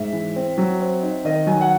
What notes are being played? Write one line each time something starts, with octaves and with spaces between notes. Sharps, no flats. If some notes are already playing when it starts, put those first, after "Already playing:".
Already playing: G#2 E5
E3
C4
F#3
C4
D#4
D#3 D#5
F#3 G#5
F#5